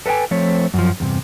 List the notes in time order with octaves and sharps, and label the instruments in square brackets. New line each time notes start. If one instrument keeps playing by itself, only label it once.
[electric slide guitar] A4 B4 F5 G5 G#5
F3 A3 C4 C#5
F#2 F3
E2 G2 C3